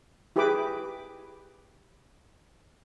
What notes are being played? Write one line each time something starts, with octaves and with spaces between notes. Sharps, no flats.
E4 G4 G#4 B4 B5 D6